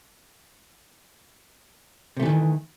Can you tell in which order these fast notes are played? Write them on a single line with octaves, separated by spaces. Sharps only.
C3 A3 E3 D#3